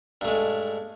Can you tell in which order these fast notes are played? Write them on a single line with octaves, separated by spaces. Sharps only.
G2 A3 G#3